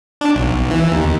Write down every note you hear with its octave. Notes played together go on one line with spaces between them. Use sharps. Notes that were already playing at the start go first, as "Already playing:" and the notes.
D4
B1
E3
D#2